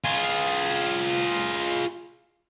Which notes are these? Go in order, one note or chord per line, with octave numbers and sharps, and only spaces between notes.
F4 G#4